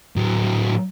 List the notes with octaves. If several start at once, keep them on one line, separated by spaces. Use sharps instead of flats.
A2 F#3